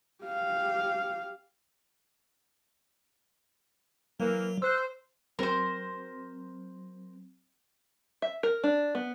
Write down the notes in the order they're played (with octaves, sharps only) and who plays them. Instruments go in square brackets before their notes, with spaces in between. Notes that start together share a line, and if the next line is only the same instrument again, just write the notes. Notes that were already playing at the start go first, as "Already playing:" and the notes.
[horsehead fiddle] G4 F5
[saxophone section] E3 A#3 [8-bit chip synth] F#3
[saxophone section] C5 [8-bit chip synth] E6 F#6
[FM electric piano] F#3 C4 [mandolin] A#4 C5
[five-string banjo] E5
A#4
D4
B3